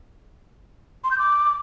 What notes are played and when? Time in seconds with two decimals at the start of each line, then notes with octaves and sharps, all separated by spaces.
1.04 C6
1.11 G6
1.18 D6